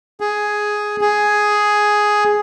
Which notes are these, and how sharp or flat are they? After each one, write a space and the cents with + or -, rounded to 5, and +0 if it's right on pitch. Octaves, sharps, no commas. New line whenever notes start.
G#4 +5
G#4 +5